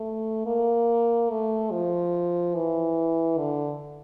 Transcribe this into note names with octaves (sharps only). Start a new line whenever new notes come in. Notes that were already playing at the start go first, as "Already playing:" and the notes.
Already playing: A3
A#3
A3
F3
E3
D3